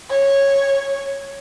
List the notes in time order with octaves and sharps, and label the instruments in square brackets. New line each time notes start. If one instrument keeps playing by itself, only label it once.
[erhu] C#5